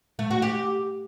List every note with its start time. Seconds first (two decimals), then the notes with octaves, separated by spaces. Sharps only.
0.19 A3
0.31 F#4
0.42 G4